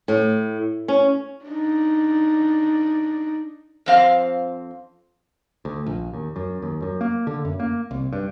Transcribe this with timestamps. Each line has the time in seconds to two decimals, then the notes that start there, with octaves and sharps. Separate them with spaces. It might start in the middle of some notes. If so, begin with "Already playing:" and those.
0.08 A2
0.88 C#4
1.45 D4 D#4
3.86 F2 C4 F5
5.65 D2
5.86 A#1
6.14 D#2
6.36 F#2
6.62 D#2
6.82 F#2
7.01 A#3
7.27 D3
7.45 F#2
7.60 A#3
7.91 C2
8.13 G2